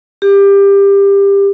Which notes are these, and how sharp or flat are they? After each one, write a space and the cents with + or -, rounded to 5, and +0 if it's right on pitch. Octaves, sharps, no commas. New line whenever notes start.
G4 +20